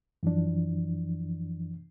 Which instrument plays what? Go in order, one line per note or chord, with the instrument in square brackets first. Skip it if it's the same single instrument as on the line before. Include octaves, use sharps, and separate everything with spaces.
[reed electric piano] F#2 E3 F3 D4